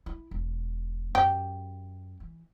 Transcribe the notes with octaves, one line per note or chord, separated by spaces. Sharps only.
E4
E1
F#2 G4
E3